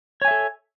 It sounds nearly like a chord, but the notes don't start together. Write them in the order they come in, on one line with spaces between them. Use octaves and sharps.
C#5 G#5 E5 A4